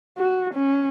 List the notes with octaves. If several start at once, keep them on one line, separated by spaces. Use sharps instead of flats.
F#4
C#4